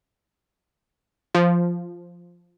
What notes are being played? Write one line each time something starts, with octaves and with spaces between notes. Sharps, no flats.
F3